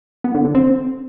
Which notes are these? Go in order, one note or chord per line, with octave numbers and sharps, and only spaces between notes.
B3
D3
D3
C4